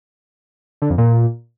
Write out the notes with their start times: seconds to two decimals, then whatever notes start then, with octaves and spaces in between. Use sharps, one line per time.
0.82 D3
0.90 F2
0.98 A#2